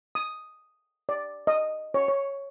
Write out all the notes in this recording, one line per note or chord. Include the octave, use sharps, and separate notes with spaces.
D#6
D5
D#5
C#5
C#5